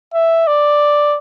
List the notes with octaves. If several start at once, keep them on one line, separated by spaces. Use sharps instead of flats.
E5
D5